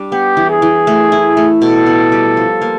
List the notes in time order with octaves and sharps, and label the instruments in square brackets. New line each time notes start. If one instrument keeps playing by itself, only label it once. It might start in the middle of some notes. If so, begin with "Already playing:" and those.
Already playing: [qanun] G3 D4
[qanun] B3 [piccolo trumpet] G4
[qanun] E3
[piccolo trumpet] G#4
[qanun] E3
A3
E4
A3
[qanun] B2 [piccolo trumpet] A4
[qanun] B3
G3
F3
A#3